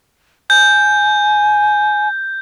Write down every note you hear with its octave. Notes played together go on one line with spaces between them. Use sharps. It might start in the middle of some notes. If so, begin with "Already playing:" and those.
G#5 G6